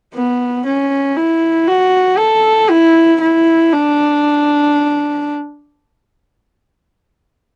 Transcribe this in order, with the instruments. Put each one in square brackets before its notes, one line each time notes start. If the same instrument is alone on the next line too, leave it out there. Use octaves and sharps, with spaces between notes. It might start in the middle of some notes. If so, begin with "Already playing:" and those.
[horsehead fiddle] B3
C#4
E4
F#4
A4
E4
E4
D4